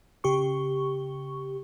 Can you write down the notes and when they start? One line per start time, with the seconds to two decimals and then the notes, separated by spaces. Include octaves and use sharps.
0.24 C#3 G4 C#6